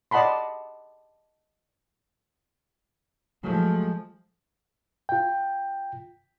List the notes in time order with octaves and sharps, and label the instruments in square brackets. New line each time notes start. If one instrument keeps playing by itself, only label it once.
[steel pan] D5 D#5 F#5 A5 B5 C6
[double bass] F3 G#3 [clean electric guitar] F#3 A3
[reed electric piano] F4 G5